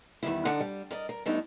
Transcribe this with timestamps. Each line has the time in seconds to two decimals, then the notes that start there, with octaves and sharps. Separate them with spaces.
0.23 E2 D#3 G3 E4
0.45 D3 D4 D#4 D5 F#5
0.60 G3
0.91 A#4 D5 D#5
1.09 A#4
1.26 F#2 G3 A3 B3 D4 D#4